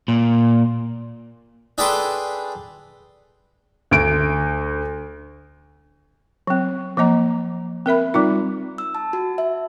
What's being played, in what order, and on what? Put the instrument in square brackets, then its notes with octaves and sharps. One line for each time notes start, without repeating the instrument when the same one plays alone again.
[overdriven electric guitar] A#2
[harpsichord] D4 G#4 A4 B4 G5 C6
[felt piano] D2 D7
[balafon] F#3 C4
F3 A#3 D#5 A#5
C4 A#4 E5 B5
G3 C4 D#4 F4
[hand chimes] E6
A5
F#4
E5